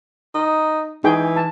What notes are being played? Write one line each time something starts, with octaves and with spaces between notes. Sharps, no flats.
D#4
E3 D#4 G#4 G5
A5